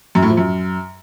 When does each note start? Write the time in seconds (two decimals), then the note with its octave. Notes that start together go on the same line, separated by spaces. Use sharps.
0.15 F#2
0.23 A2
0.30 F3
0.37 F#2